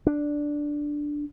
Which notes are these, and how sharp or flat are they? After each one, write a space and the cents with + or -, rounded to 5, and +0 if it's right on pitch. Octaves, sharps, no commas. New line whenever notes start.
D4 +0